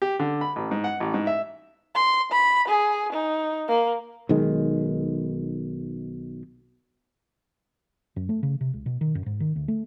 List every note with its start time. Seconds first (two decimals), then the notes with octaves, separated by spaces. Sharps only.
0.02 G4
0.20 D3
0.41 B5
0.56 A1
0.71 G#2
0.84 F#5
1.00 A1
1.14 G#2
1.27 E5
1.95 C6
2.32 B5
2.68 G#4
3.12 D#4
3.69 A#3
4.29 B1 D#3 G#3
8.16 F#2
8.29 A3
8.43 C#3
8.61 C3
8.73 C#2
8.86 B2
9.01 D#3
9.15 F#2
9.26 G#2
9.40 D#3
9.56 D2
9.68 A3